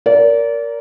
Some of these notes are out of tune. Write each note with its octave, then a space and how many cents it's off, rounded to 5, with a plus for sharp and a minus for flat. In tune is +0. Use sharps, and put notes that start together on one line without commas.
A#4 +0 D5 -30